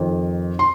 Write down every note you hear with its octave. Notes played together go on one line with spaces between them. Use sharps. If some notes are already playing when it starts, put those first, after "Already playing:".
Already playing: F2 D#3
C6